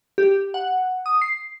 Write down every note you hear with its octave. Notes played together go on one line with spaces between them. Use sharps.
G4
F#5
D#6
C7